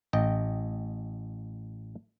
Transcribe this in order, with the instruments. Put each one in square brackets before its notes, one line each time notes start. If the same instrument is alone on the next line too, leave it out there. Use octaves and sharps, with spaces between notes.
[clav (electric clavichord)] A1 D#5 G5